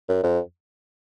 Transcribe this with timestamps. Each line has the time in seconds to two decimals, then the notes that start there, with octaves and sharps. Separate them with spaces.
0.09 F#2
0.23 F2